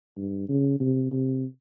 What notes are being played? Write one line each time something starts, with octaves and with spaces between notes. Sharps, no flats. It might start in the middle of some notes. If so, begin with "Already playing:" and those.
G2
C#3
C3
C3